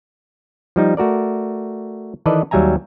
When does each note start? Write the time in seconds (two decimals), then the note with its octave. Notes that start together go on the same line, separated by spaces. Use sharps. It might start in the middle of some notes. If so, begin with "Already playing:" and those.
0.76 F3 G3 D#4
0.97 A3 F#4 A#4 D5
2.26 D#3 E3 A4 B4 D5 D#5
2.51 D#2 F#3 G3 E5 G#5 A#5